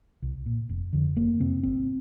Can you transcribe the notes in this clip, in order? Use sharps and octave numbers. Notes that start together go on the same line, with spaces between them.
C2
A#2
F1
F2 D3
F1 A#3
F2 C3 C4
G#1 C4